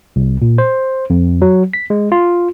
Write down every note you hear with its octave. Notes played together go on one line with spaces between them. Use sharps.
C2
A#2
C5
F2
F#3
B6
G#3
F4